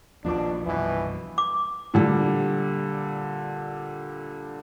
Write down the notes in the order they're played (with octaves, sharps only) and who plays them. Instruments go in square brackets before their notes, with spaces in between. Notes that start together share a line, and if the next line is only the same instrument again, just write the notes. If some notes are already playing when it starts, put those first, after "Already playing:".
[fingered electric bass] A#1 D#2 A#3 [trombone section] B2 D4 [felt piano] F3 F4 D6
[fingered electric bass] C2 G2 [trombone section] B2 E3
[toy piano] D6
[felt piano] A#2 D3 G3